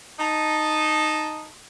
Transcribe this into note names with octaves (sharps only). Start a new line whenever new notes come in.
D#4 A5